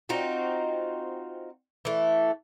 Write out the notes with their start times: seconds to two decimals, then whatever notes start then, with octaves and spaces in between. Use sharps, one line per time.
0.09 C4 D#4 F4 F#4
1.85 E3 A3